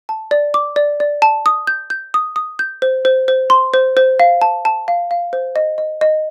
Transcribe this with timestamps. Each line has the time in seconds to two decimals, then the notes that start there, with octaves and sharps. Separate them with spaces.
0.09 A5
0.31 D5
0.54 D6
0.76 D5
1.00 D5
1.22 A5
1.46 D#6
1.67 G6
1.90 G6
2.14 D#6
2.36 D#6
2.59 G6
2.82 C5
3.05 C5
3.28 C5
3.50 C6
3.74 C5
3.97 C5
4.20 F5
4.42 A5
4.65 A5
4.88 F5
5.11 F5
5.33 C5
5.56 D#5
5.78 D#5
6.01 D#5